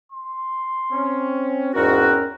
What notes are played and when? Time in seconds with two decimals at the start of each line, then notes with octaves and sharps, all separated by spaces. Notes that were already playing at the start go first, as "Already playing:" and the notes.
0.12 C6
0.92 C4 C#4
1.75 E2 G#2 C4 C#4 F#4 A#4